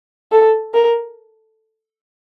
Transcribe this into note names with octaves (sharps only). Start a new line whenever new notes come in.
A4
A#4